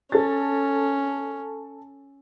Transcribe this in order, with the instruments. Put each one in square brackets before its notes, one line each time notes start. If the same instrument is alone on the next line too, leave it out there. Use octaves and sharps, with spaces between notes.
[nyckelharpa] C#4 [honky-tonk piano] A4 A6